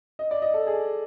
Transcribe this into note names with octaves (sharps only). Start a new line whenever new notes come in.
D#5
D5
D#5
A4
G#4